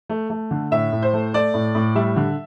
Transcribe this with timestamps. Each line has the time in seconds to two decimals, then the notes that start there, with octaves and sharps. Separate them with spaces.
0.09 A3
0.30 A3
0.51 D3
0.71 A2 E5
0.92 A2
1.03 C5
1.13 A3
1.34 A3 D5
1.54 A2
1.75 A2
1.95 G3 E5
2.16 D3